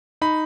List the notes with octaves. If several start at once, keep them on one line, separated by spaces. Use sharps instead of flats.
D#4 B5